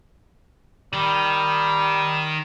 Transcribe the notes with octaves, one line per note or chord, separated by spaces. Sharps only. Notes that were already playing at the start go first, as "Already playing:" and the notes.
D#3 G3